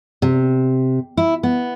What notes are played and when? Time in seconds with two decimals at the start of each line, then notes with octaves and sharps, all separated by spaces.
0.22 C3
1.17 E4
1.43 B3